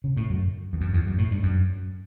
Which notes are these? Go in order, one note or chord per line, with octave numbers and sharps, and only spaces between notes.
C#3
A2
F#2
E2
F#2
E2
F#2
A2
G2
F#2